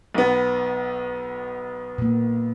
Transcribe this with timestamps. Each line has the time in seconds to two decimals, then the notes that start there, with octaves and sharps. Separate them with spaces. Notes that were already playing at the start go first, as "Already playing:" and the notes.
0.15 B1 B3
1.98 A#2 A#3